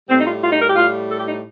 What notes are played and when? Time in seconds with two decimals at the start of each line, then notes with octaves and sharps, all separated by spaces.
0.09 A2 G3 C4
0.17 D#4
0.25 F4
0.42 F4
0.51 D#4
0.59 A#4
0.67 G4
0.75 A2 G3 F4
1.08 A4
1.17 G4
1.26 D#4